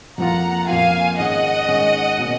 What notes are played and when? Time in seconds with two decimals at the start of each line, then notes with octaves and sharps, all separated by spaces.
0.18 F2 F3 A#3 F4 F#5 A#5
0.68 F2 F3 A#3 F4 F5 G#5
1.18 G#2 D#3 G#3 C#4 D#5 F#5
1.67 G#2 D#3 G#3 C#4
2.19 B2 A#3 C#4